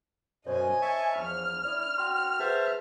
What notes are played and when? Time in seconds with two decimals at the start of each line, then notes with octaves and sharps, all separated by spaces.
0.47 F#2 B2 C5 C#5 D#5 G#5
0.82 E5 A5 C#6
1.17 E2 F3 F6
1.65 E4 D5 D#6
1.98 F#4 G5 C6
2.39 G#4 B4 C5 E5 F#5 A5